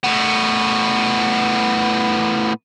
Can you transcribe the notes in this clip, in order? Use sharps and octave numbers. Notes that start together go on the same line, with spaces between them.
A2 B3